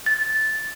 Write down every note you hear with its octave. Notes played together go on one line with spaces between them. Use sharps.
A6